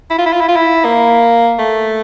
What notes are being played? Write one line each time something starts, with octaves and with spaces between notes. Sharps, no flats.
E4
F4
E4
F4
E4
F4
E4
A#3
A3